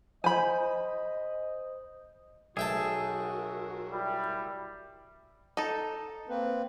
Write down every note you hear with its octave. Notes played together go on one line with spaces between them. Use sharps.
C5 D#5 G#5 B5 G6
B1 F#4 G#4 A#4 E5 G5 A5
G3 E4
D#4 A4
A#3 C4 B4